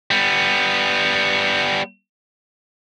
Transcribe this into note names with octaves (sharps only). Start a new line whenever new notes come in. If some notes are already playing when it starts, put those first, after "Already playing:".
G3 B3